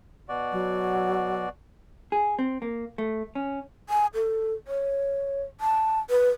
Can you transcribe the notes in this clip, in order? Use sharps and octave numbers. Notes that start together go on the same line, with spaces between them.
B2 F#4 D5
F#3
G#4
C4
A#3
A3
C#4
G#5
A4
C#5
A5
B4